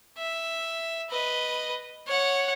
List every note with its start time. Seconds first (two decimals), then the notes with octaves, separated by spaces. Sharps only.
0.18 E5
1.10 B4 D#5
2.07 C#5 F#5